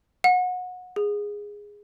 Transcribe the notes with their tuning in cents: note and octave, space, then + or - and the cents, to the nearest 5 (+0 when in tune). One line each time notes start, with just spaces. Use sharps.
F#5 -25
G#4 -10